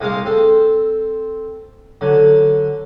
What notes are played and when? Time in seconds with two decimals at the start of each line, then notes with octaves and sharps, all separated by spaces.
0.01 C2 G#3 C4 F5 C#6 D6
0.25 C4 A4
2.01 D3 F#3